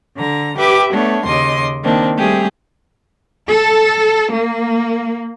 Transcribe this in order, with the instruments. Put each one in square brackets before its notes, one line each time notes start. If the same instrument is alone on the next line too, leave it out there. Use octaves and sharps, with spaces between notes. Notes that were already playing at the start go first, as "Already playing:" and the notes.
[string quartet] D3 A#5
G4 B4 E5 D6
A3 B3 D4 C#5
D#2 C#3 D#5 C6 D6
D#3 A#3 C4 D4
G3 A3 C4 G4 G#4
[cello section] A4
A#3